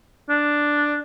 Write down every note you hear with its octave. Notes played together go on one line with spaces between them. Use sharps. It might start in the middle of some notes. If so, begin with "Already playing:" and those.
D4